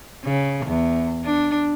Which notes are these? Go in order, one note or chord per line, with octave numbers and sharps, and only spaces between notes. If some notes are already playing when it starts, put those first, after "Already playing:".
C#3
E2
D4